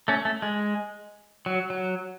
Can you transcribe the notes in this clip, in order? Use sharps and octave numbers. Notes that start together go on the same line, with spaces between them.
A3 C#4
A3
G#3
F#3
F#3